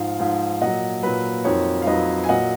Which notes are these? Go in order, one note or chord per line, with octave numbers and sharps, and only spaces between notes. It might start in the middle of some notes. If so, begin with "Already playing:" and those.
Already playing: G#2 F3 F5
G#2 F3
A#2 F#3 D#5 F#5
A#2 F#3 B4
F2 D#3 F#3 C#5
F5
F2 D#3 F#3 B4 D#5
G#5
A#2 F#3 D#5 F#5